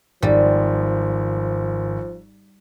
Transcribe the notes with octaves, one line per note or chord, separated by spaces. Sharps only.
G#1 F3 G3